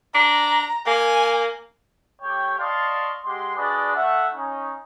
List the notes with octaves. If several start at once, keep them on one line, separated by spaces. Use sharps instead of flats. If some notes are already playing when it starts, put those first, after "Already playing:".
D4 A#5
A#3 G#5
A3 G4 C#5 G5
D5 D#5 F5 A5 C6 C#6
G#3 G4 F#5 C6
D4 F#4 G#4 B4 D5 D#5
A3 E5 F#5
C#4 D#4